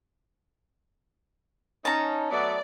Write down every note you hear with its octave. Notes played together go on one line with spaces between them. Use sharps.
C#4 D#4 A5 A#5
F#3 A3 B3 D5